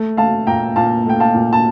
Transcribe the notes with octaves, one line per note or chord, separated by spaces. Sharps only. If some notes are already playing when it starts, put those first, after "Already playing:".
Already playing: A3
A3 F5 A5
A#2 G5 A#5
A#2 F5 A5
A3 G5
F5 A5
A#2
A5